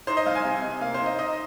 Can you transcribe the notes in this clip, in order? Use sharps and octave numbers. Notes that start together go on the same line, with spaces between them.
D#4 C5
D#5
C2 F5
G#5
C3
C3
A#3 F5
C5
D#4
D#5
D#4 D#5